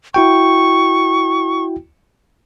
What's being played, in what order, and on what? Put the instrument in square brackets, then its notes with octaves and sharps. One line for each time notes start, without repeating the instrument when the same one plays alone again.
[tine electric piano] E4 F#4 G5 [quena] C#6